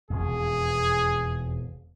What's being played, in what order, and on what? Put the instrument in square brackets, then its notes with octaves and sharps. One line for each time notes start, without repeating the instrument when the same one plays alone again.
[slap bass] E1 F2 [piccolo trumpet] G#4